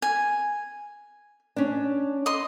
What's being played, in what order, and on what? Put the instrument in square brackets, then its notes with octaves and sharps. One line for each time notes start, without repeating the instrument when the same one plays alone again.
[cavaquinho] G#5
[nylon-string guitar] C#4 D4
[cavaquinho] D#5 C6